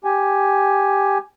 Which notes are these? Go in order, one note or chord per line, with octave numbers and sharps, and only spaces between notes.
G4 G#5